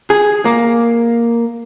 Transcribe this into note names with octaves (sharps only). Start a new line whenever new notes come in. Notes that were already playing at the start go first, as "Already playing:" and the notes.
G#4
A#3